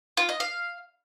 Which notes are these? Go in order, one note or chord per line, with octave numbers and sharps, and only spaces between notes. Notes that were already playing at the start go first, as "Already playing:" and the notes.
F4
D#5
F5